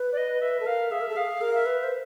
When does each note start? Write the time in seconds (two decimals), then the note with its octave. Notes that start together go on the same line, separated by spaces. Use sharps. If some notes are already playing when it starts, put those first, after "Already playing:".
Already playing: B4
0.12 D5
0.17 D#5
0.41 B4 E5
0.60 A4
0.66 A#4 F5
0.91 G#4 E5
1.01 A#4
1.09 A4
1.16 G#4 F5
1.41 A#4
1.53 E5
1.66 B4
1.83 C5